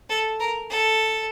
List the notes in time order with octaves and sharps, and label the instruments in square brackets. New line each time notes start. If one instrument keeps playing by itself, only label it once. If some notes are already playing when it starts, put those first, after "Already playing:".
[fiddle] A4
A#4
A4